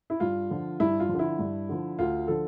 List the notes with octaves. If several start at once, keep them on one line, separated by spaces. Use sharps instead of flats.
E4
G2 F4
D3 F3
G2 E4
F4
F3
D3
E4
G2
D3 F3
D2 F4
D3 F3 A4